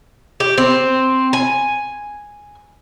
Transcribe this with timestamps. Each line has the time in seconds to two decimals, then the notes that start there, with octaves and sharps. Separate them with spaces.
0.40 G4
0.58 C4
1.33 G#5